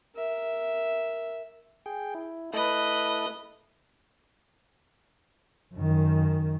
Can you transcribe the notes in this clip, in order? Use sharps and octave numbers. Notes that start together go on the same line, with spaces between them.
A#4 E5
G#4 G5
E4
A3 E4 A4 B4 D#5
F#2 D#3